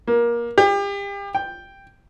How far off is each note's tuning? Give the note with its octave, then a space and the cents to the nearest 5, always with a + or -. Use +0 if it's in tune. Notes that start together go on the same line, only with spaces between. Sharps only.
A#3 +20
G4 +35
G5 +5